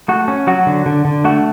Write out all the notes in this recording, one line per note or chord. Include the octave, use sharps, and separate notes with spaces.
A3 F#4
C#4
F#3 F#4
D3
D3
D3
A3 F#4